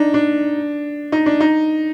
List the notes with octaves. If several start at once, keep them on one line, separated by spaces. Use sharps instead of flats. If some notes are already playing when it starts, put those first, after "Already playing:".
Already playing: D4 D#4
D4
D#4
D4
D#4